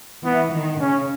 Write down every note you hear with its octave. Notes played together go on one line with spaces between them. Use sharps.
E3 B3
D#3
C#3 C#4